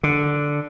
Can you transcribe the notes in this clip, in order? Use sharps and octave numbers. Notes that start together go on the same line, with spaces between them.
D3